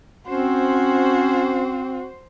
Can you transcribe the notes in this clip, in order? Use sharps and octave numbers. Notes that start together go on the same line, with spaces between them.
C4 C#4 F#4 C5